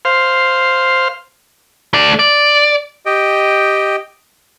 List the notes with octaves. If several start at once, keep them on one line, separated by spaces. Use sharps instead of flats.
C5 F5
A3 D5
D5
G4 D#5 G5